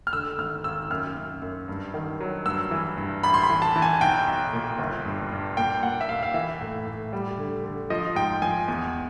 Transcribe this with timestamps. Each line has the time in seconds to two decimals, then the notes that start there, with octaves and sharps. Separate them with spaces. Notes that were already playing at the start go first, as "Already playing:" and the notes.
0.07 F6
0.13 D3 E6
0.38 G#1 F6
0.64 G#1 E6
0.90 F#2 F6
1.16 F#2
1.42 F#2
1.68 G2
1.94 D#3
2.20 F#3
2.46 G2 E6
2.71 E3
2.97 G2
3.23 A1 B5
3.34 C6
3.43 B5
3.50 E3
3.62 A5
3.76 E3
3.82 G#5
4.01 B1 G5
4.27 B1
4.53 A#2
4.79 G1
5.05 G2
5.32 G2
5.57 A#2 G5
5.83 A#2 F#5
6.01 E5
6.09 A#2 F5
6.23 F5
6.34 E3 E5
6.61 A2
6.86 A2
7.13 G3
7.38 D3
7.64 D3
7.90 F3 D#5
8.15 G#2 G5
8.42 F3 G#5
8.68 E2